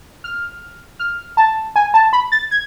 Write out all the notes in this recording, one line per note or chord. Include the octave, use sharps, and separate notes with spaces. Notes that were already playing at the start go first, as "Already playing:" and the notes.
F6
F6
A5
G#5
A5
B5
A6
G#6